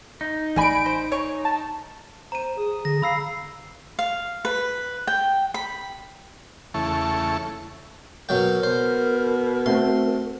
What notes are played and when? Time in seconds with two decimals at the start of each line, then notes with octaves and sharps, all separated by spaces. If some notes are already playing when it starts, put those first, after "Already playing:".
0.21 D#4
0.56 A1 G3 G#5 B5 D7
0.86 C5
1.12 G#4 C#5
1.45 A5
2.32 C5 A#5 D#7
2.58 G#4 D#6
2.85 D3 A#6
3.02 F5 A#5 B5 E6 C7
3.99 F5
4.45 B4
5.07 G5
5.54 B5
6.74 E2 C#3 A3 E4 A5 C#6
8.29 B2 F#3 A#4 G5
8.63 B2 C5
9.66 A3 C4 F#4 C6